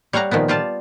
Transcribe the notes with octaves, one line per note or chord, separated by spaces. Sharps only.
G3 C#5 F5 F#5 A#5
A#2 D#3 F3 B3
G3 F4 D5 A5